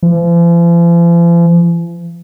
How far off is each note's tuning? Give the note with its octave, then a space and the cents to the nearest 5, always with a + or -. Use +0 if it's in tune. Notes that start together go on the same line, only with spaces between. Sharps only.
F3 -45